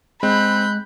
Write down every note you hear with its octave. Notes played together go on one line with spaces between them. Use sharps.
G#3 C4 B5 F#6 G6